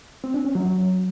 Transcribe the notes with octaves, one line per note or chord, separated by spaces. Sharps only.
C4
D4
C#4
F#3